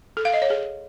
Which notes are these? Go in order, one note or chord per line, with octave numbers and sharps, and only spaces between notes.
A4
F5
D#5
C#5
G#4